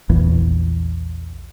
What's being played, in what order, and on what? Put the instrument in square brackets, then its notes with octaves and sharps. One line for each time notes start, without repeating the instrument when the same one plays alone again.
[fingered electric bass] A#1 E2